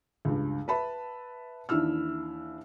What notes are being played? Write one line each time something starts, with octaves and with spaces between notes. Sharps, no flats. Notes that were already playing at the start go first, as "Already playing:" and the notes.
C#2 G2
B4 E5 A5 B5
D#2 E3 D4 E4 E6 F6